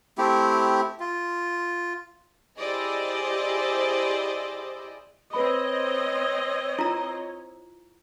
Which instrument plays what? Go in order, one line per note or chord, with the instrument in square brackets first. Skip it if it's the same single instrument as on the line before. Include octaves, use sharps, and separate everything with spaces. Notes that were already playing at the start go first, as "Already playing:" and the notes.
[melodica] A3 C4 E4 G4
F4
[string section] E4 G4 G#4 C5 D5 D#5
[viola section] C4 D#5 [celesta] B4 B5 [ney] C#5
[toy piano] E4 F4 A#5